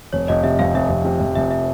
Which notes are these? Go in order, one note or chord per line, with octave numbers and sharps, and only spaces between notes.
F1 C#5
F1 D#5
C3 E5
F2 F5
F1 E5
F1
C3
F2
F1 E5
E5